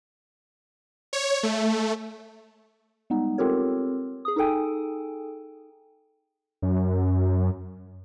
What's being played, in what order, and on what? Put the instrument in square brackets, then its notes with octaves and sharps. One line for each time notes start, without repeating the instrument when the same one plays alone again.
[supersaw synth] C#5
A3
[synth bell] G3 G#3 B3 D#4
C4 F4 G4 A4 A#4 C#5
G#4 D#6
D#4 G#4 A4 G5 G#5
[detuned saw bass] F#2